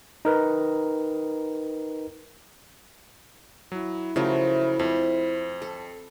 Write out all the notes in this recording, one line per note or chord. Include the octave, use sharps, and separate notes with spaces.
D#4 A#4 B4
F#3 E4
C#3 F3 F#3 A3 A#4
F2 C4 F4
A4